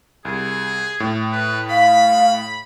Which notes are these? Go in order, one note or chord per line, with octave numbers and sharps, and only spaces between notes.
C2 G#4
A2
B4
F5 B5